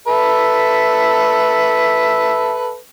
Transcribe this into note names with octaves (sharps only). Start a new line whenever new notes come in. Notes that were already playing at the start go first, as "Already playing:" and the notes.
A4 B4 E5